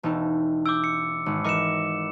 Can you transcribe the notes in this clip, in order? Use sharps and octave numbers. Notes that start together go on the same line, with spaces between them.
E1 D#4 A4
D6 E6 G6 D7
C#7
G#1
E3 A#4 D#5 D6 C#7 E7